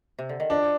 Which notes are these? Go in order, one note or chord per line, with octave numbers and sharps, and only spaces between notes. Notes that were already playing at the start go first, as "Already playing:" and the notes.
C3
D3
D#3
F3 D4